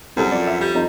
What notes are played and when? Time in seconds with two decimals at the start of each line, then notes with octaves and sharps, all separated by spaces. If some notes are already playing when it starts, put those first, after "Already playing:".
0.17 C2 F#2 G4 A4
0.32 F2 D5
0.47 E5
0.61 G3 G6
0.75 F2 D#4 A#5